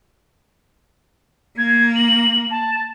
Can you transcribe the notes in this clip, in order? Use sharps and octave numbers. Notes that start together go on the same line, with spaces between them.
A#3 G#6
F#7
A5